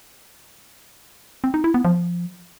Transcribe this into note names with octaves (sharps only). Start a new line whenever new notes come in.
C4
D#4
E4
B3
F3